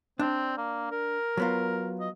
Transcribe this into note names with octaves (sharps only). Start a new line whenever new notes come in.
C4 D4
A#3
A#4
F#3 B3 F4
D#5